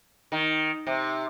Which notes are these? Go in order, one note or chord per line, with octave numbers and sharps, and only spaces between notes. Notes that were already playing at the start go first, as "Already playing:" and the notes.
D#3
C3